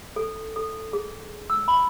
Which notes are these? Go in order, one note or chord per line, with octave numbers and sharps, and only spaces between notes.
A4
A4
G#4
E6
B5